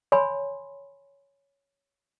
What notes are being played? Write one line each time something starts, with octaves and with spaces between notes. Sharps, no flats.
C#5 G#5 B5 C6